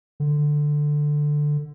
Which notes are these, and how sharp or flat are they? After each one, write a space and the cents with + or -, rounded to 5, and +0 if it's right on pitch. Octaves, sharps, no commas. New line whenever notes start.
D3 +10